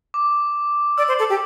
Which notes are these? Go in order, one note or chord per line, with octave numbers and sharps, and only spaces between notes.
D6
D5 E6
C5
A4
G4